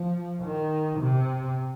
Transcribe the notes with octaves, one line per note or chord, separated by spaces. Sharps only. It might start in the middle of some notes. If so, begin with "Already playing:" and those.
Already playing: F3
D#3
C3